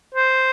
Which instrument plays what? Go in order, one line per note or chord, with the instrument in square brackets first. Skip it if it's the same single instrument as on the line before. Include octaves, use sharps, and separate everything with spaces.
[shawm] C5